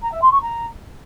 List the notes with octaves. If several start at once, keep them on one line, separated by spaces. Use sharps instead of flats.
A#5
E5
C6
C#6
A#5